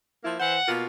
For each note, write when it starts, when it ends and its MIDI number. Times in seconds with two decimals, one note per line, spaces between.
0.24 0.37 53
0.24 0.37 58
0.24 0.37 64
0.39 0.56 52
0.39 0.56 72
0.39 0.70 78
0.68 0.87 47
0.68 0.87 58
0.68 0.87 65